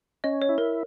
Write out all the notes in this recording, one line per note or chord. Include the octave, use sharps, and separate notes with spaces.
C#4 D#5
C#5
E4
A#4